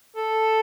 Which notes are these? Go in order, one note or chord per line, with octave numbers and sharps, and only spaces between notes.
A4